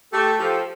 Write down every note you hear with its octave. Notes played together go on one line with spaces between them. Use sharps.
A3 G4 A4
F3 G4 A4